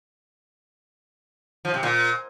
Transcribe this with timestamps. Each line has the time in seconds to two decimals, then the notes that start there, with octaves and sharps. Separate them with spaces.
1.65 F3
1.74 C3
1.83 A#2